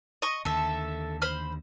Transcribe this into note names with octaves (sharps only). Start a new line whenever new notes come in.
D#5 C#6
D#2 D3 A4 E5
C5 B5 F6